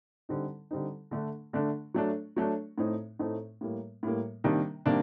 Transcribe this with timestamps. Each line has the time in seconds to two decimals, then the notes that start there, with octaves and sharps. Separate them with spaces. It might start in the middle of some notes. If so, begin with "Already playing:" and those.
0.29 D3 G3 C4 D#4
0.71 D3 G3 C4 D#4
1.11 D3 A3 D4
1.53 D3 A3 D4
1.94 F#3 A3 D4
2.36 F#3 A3 D4
2.78 A2 A3 C4 D#4
3.19 A2 A3 C4 D#4
3.61 A2 G3 A#3
4.03 A2 G3 A#3
4.44 C3 D#3 G3 A#3 D4
4.86 C3 D#3 G3 A#3 D4